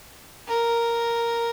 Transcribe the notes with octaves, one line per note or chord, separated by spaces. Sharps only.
A#4